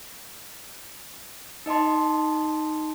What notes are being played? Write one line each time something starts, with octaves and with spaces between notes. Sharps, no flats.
D#4 D#5 A5 C6